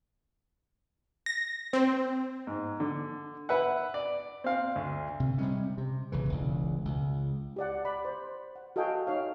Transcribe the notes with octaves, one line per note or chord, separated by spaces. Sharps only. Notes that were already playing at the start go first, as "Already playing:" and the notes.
A#6
C4
G#2
D3
B4 E5 F#5
D5
C4 F5
D2
C3
C3 G3 G#3 C#4
C3
B1 C#3 E3
E1 C#2
C#2
G4 D5 F#5
D5 B5
C5
F#5
F#4 A4 D#5 F5 G5 G#5
D#4 C#5 F5